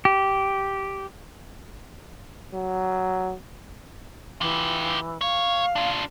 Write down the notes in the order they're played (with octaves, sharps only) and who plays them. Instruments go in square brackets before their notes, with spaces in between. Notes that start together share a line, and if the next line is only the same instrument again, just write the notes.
[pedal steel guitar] G4
[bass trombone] F#3
[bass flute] E3 [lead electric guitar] F4 G4
[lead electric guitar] C#5 [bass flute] F5
[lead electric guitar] D4 F4